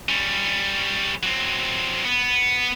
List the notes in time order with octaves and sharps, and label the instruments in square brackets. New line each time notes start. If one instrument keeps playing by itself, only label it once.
[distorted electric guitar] G3 C#4
F#3 C4
B3